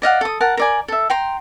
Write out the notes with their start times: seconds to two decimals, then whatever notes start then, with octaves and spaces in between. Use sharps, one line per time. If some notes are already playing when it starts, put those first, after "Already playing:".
0.02 D5 D#5 F5 F#5
0.21 A4 D#6
0.41 A#4 F#5 A5
0.57 A#4 D5 G#5
0.88 A4 E5
1.10 G5 A#5 C6